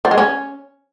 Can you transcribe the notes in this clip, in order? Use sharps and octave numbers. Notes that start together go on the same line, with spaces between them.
F3
G#3
C#4